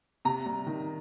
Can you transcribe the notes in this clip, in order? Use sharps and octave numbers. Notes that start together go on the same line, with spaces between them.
C3 A#5
G3
D#3